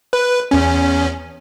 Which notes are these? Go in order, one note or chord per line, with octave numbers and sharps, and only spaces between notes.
B4
E2 C#4